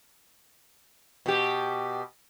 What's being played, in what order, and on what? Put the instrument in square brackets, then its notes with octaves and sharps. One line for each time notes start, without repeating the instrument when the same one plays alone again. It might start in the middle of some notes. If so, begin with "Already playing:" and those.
[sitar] B2 G4